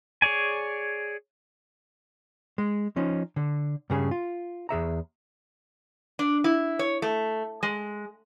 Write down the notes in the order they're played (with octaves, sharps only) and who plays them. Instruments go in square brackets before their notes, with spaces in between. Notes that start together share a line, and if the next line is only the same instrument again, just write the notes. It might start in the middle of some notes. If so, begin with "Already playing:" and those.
[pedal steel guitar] G#4 C#5 D5 G#5
[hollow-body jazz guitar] G#3
F3 C#4 D#4
D3
G2 C#3 G#4
F4
E2 G#4 E5 A#5
[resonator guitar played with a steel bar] D4
E4
C#5
A3
G#3